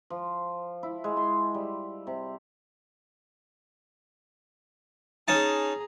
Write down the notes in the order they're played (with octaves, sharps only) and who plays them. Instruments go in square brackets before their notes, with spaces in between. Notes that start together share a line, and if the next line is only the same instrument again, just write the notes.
[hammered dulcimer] F3
E4
G#3
C6
G3
C3
[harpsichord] C#4 D#4 A5 [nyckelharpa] G#4 A#5